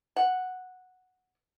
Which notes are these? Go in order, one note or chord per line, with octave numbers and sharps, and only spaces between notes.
F#5